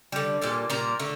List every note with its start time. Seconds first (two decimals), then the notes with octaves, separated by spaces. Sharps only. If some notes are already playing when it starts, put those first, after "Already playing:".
0.12 D3 G3
0.42 A#2 G3 A4
0.70 A#2 G3 A#4
0.99 D3 A3